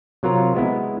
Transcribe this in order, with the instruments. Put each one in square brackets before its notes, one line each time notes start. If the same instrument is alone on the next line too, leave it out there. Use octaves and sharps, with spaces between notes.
[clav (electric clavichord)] C3 F#3 F4 A#4 A#5
G#3 B3 E4